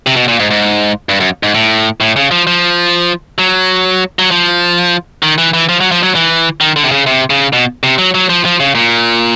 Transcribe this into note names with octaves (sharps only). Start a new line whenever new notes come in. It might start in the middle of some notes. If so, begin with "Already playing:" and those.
C3
B2
A#2
G#2
G#2
G2
F#2
G#2
A2
A2
C#3
F3
F3
F#3
F#3
F3
D#3
E3
E3
F3
F#3
F3
F#3
E3
D#3
D3
C3
C#3
C3
C#3
B2
C3
F#3
F#3
F3
F3
C#3
A#2